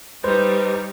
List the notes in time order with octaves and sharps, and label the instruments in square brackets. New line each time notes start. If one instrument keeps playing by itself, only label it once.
[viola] G3 D#4 [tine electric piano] B4 C5